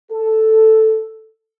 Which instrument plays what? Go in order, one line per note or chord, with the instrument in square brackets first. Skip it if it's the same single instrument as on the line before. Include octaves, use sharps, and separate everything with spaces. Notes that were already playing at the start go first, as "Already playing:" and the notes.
[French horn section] A4